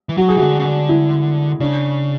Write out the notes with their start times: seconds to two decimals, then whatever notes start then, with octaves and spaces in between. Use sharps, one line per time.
0.09 E3
0.17 F#3 F#4
0.28 G#4
0.37 D3 E3 F#4
0.59 C#3
0.65 D3
0.89 E4
1.60 C#3 D4